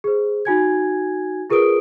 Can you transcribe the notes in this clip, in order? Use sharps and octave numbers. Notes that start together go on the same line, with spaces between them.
G#4 C5
D#4 F#4 G#5 G#6
F4 G#4 A#4 B4 D#6 D7